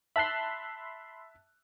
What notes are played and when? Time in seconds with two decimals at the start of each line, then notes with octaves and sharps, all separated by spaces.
0.16 E5 A5 B5 C6 F#6